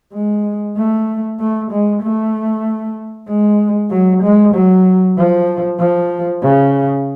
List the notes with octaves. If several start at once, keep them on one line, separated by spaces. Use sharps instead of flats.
G#3
A3
A3
G#3
A3
G#3
F#3
G#3
F#3
F3
F3
C#3